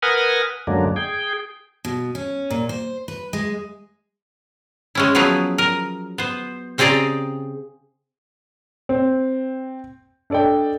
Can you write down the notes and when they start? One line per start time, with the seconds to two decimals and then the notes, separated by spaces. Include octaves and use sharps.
0.03 A#4 B4 F#5 G#5 D#6 F6
0.67 F#2 D3 F#3 G#3 A#3 D4
0.96 G#4 G5
1.85 B2
2.15 C#4
2.51 A#2
2.69 C5
3.08 B4
3.33 G#3
4.95 G#3 C#4 E4
5.15 F3 F#3 B3 E4 G#4
5.58 A#4
6.18 B3 C5
6.78 C#3 C4 G4 G#4 D5 A#5
8.89 C4
10.30 D4 A4 D5 D#5 G5